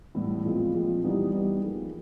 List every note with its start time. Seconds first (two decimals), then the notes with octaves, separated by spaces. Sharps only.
0.15 A2 E3 G3 B3 E4
0.45 A#2 F3 G#3 C4
0.74 A#2 F3 G#3 C4
1.03 E3 G3 B3 D#4 G4
1.32 E3 G3 B3 D#4 G4
1.62 F3 A#3 D#4 G#4